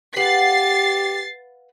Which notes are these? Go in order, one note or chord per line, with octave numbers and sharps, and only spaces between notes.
G4 B4 F5 F#5 A6 C7